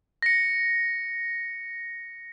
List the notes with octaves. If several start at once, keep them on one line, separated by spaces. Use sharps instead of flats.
A#6 C#7